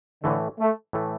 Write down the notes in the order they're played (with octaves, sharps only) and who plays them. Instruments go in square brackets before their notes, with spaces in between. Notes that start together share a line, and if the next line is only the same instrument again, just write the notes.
[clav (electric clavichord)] A2 E3 A3 [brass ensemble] D3
[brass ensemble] A3
[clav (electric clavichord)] A2 E3 A3